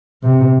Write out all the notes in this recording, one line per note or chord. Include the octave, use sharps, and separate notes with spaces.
C3